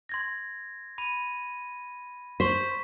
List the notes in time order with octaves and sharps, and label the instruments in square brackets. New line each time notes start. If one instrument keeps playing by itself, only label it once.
[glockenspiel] C6 G#6 A#6
B5 D#7
[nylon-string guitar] C5 [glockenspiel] C6 C#6 B6